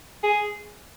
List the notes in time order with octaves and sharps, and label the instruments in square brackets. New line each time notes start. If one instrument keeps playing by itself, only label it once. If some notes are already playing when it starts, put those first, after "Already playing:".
[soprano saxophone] G#4